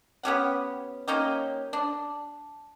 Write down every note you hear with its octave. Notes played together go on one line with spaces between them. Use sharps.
B3 C#4 G4 F#5
A#3 C#4 D#4 G4
D4